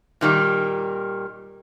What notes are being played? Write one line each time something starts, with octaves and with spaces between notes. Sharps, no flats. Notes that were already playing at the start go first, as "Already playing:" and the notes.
A#2 D#3 G3